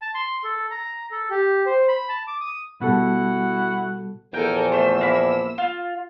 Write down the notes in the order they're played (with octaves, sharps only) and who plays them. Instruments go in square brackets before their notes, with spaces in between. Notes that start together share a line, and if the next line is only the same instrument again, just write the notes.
[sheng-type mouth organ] A5
C6
A4
A#5
A4
G4
C5
B5
A5
D6
D#6
[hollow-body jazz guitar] B2 [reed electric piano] G3 A4 [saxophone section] E4 F#4 F#5
[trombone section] E2 A#2 F3 [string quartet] A4 A#4 G#5 [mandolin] G5
[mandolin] A3 C5 [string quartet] E6
[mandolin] A#3 E4
F4